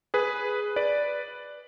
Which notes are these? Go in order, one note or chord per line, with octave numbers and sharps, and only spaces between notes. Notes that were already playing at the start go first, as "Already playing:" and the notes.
G#4 B4
B4 D5